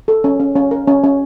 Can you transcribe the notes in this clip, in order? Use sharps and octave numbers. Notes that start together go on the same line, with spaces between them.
A4
C#4
C#4
C#4
A#4
C#4
C#4